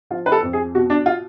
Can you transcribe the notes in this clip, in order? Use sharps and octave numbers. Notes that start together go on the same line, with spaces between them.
F3 F4
B4
A4
F2
G#4
B2 F#4
D4
F4